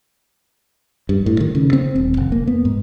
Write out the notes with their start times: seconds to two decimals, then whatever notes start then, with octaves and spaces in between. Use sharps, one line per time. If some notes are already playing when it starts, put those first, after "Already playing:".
1.09 G2
1.26 A2
1.40 D#3
1.55 C#3
1.73 C4
1.96 D#1
2.17 F1
2.32 A#3
2.47 B3
2.65 G#2